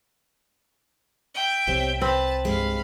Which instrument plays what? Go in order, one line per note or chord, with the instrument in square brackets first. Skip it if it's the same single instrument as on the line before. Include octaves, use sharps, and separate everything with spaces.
[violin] E5 G5
[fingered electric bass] C2 [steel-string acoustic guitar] G3 C4 C#5
[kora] C4 [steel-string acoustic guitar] B4 [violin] A5 B5
[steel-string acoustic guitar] G2 G#3 [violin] F5 B5